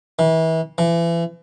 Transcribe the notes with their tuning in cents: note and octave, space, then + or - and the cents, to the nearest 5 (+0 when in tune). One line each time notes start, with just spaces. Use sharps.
E3 -30
E3 +35